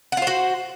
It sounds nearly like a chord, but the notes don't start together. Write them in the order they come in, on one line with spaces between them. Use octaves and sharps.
F#5 F4 C5 F#4